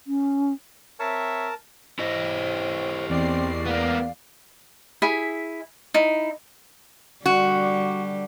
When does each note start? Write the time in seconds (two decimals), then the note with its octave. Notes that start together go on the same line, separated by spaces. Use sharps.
0.07 C#4
1.00 C4 A#4 C#5 E5 A5
1.99 E4 G4 C5 D#5
3.09 E2 C4 D5 C7
3.66 A#3 B3 F5
5.02 E4 G#4 B5
5.94 D#4 E4
7.26 D3 G3 F#4